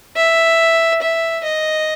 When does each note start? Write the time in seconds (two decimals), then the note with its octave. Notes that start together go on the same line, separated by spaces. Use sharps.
0.16 E5
1.02 E5
1.44 D#5